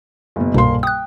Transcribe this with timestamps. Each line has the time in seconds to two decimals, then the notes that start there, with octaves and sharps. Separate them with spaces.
0.36 F#1 B2
0.54 D#1 C2 G2 B2 A#3 C6
0.83 G5 D#6 F#6